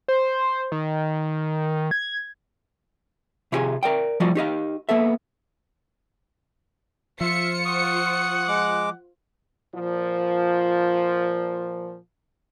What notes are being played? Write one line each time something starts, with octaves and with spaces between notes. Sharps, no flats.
C5
D#3
G#6
C3 E4 F4 G4 G#4 G#5
A#4 D5 G5
F3 G3 F4 F#4 D5 D#5
D#4 G4 D#5 F5
A#3 B3 A4 E5
F3 F4 C5 E5 C#7
F#5 C#6 D#6
G#3 D6
A#2 F3